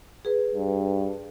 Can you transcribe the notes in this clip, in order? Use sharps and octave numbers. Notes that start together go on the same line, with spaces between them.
G#4 B4
G2